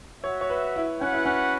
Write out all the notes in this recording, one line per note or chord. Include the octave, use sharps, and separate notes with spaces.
F#4 C#5 E5
C#5
B4
E4
C#4 F#4 B4 F#5
E4
C#4